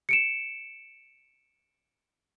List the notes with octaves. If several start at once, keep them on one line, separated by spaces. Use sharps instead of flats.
C#7 D7 E7